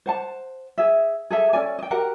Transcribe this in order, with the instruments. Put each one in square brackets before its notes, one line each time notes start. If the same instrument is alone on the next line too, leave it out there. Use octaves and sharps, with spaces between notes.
[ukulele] C5 F#5 A5
G#4 E5
G#4 A4 E5
C#4 A4 D5 G#5
D#5 G5
F#4 G4 A#4 F#5